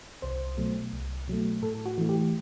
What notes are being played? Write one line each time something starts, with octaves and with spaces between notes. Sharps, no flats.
C2 C5
B2 F#3 A3
C2
B2 F#3 A3
A2 A4
F#4
E3 A3
G4